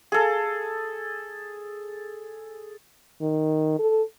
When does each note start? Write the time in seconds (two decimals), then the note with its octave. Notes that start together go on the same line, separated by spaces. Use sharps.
0.12 G#4 A4
3.22 D#3
3.79 A4